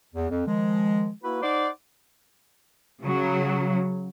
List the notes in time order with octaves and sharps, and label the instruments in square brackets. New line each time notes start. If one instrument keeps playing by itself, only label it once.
[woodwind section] E2
F2
D#3 F3 G#3
A#3 E4 F#4 B4
D#4 C5 D5 F#5 C6 D6
[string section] C#3 F#3